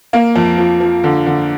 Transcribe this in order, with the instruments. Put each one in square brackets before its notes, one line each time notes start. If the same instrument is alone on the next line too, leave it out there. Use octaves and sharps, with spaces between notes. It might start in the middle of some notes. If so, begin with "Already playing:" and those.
[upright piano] A#3
F2
F3
F3
D3
D3